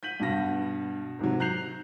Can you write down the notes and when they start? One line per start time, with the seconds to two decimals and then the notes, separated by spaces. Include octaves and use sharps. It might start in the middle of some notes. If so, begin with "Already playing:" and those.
0.03 G6 B6 D#7 F#7
0.20 G2 B2 A#6
1.19 G#2 C3 D#3 F#3
1.39 A#5 F#6 G6 C7 F7